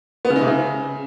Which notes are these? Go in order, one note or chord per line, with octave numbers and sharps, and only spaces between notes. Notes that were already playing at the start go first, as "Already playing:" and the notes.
B3
C#3
D#4
C3
C#3